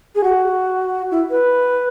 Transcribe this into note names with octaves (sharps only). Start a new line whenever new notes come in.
G#4
F#4
E4
B4